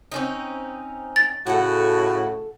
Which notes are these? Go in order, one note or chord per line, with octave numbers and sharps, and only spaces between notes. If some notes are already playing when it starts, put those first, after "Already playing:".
C4 C#4 D#4
A6
A2 C#3 F#4 A4 F#5